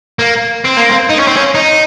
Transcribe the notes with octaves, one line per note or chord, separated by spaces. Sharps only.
A#3
C4
A#3
C4
D#4
C#4
C4
C#4
D#4